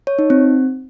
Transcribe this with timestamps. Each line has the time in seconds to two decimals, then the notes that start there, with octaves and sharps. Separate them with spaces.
0.07 C#5
0.19 D#4
0.30 C4